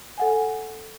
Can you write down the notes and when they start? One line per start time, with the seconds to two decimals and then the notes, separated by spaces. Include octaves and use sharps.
0.18 A4 F#5 G#5